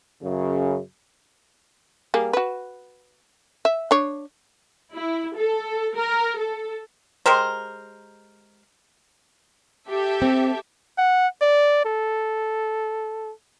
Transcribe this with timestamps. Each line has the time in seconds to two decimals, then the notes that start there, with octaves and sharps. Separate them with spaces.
0.23 F#2 C#3
2.14 G3 A#3 G#4
2.33 F#4 B4
3.65 E5
3.91 D4 C#5
4.94 E4
5.37 A4
5.96 A#4
6.37 A4
7.26 G#3 G4 A#4 C5
9.89 G4 A4 E5
10.22 C4
10.98 F#5
11.42 D5
11.86 A4